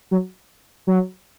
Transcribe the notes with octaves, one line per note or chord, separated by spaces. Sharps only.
F#3
F#3